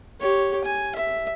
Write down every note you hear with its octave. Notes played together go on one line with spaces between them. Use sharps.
G4 C#5
G#5
E5